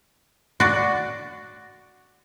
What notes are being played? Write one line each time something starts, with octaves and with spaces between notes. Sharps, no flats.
F#4 D5